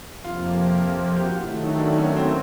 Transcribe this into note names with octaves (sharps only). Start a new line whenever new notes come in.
F2 C3 F3 A#3 F4
G4
F#4
F4
D#3 F#3 A3 E4
D#4
D4
C#4
C4